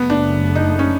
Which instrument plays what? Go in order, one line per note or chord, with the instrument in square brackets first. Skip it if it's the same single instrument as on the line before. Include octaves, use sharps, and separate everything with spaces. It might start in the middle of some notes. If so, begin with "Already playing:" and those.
Already playing: [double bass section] F#1 F#2 C#3 F#3 A3 [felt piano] B3
[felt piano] D4
D#4
C#4